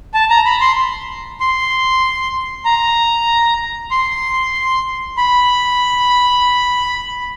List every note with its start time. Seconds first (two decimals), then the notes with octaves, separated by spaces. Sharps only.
0.14 A5
0.30 A#5
0.45 B5
0.61 C6
1.40 C6
2.65 A#5
3.91 C6
5.17 B5